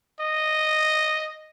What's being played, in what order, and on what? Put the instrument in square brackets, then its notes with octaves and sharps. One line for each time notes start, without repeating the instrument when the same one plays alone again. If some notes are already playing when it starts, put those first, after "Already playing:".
[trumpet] D#5